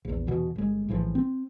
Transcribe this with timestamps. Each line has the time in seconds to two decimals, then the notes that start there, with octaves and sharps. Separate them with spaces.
0.05 A#1 E2
0.27 E2 B2 E3
0.56 G1 G#3
0.88 A#1 A2 E3 F3
1.15 C4